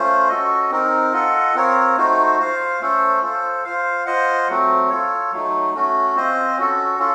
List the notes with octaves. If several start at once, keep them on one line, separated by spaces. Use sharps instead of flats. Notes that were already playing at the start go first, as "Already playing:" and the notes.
Already playing: A3 C#4 F4 C5
C#4 F#4 A4 D#5
C4 D#4 A#4
F4 A4 D#5 F#5
C4 F4 A#4 C#5
A3 D#4 F#4 C5
F4 C5 F5
A3 C#4 A4 C5
F4 A4 C5
F4 C5 F5
F4 C5 D#5 F#5
F#3 A3 C4
F4 A4 C#5
F#3 A3 D#4
A3 C#4 F#4
C4 F4 C5 D#5
C#4 F#4 A4
C#4 F4 A4